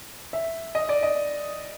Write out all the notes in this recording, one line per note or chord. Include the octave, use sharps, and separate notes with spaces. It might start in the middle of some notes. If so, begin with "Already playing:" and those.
E5
D#5
D5
D#5